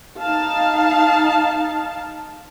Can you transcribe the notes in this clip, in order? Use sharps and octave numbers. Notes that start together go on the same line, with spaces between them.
D#4 F5 A5